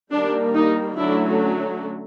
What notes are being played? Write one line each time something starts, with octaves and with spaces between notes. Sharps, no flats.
D#3 G3 A#3 D4
D#4
D3 F#3 A3 C#4 D4 E4